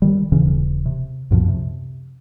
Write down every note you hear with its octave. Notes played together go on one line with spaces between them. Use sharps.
D#3 G3
D#1 C#3 E3 C#4
C3
C2 F#2 A#2 F3
C3